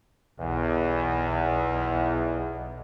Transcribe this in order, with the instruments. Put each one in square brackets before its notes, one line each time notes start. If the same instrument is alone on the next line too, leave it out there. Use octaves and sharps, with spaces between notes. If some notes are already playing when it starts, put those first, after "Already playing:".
[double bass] B1 [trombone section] E2